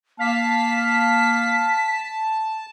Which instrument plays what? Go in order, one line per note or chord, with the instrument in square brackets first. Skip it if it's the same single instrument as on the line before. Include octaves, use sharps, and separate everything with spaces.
[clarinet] A#3 [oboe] F5 [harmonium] A5 [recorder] B6